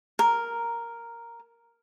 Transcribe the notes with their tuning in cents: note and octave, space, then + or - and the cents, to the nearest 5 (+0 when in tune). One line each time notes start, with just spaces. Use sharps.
A#4 +0